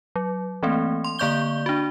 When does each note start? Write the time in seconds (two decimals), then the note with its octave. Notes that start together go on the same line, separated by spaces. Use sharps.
0.16 F#3
0.63 E3 A3 A#3 C4
1.04 C6
1.19 D3 A#3 D5 C#6 G6 G7
1.66 D4 F#4